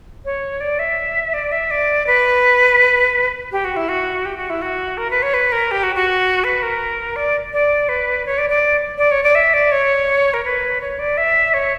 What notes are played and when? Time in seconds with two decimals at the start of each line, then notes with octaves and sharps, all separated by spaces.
0.25 C#5
0.60 D5
0.79 E5
1.34 D5
1.52 E5
1.71 D5
2.07 B4
3.52 G4
3.64 F#4
3.76 E4
3.89 F#4
4.25 G4
4.37 F#4
4.50 E4
4.62 F#4
4.97 A#4
5.10 B4
5.22 C#5
5.34 B4
5.52 A#4
5.71 G4
5.83 F#4
5.95 F#4
6.44 B4
6.62 A#4
7.16 D5
7.53 D5
7.89 B4
8.26 C#5
8.38 D5
8.50 D5
8.98 D5
9.11 C#5
9.23 D5
9.35 E5
9.54 D5
9.72 C#5
10.34 A#4
10.44 B4
10.81 C#5
10.99 D5
11.17 E5
11.54 C#5